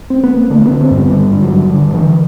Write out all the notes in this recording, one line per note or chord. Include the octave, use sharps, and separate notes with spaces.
C4
B3
A#3
D3 A3
C4
D3 B3
C4
G2
B3
D3 G3
G2
F#3
G2
D3
D3 E3